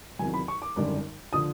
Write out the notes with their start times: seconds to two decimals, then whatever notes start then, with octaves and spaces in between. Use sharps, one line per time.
0.19 E2 C3 D#3 F#3 G#5
0.34 B5
0.48 C#6
0.62 D6
0.76 G#1 F#2 D3 G3
1.33 D3 F3 D#6